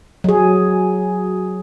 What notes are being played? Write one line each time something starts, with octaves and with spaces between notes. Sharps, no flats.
F#3 G#4